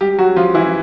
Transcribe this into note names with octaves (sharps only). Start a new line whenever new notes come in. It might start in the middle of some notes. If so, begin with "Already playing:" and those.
G3 G4
F#3 F#4
F3 F4
E3 E4